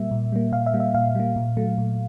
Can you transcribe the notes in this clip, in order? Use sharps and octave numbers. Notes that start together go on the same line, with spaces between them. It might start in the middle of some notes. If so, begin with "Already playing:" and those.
Already playing: A#2 G3 A#3 E5
A#2
G3 A#3
A#2 F5
E5
G3 A#3
E5
A#2 F5
G3 A#3
A#2
F#3 A3
A#2